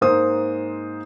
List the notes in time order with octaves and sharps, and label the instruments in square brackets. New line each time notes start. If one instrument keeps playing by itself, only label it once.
[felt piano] G#2 A#3 C5 D#6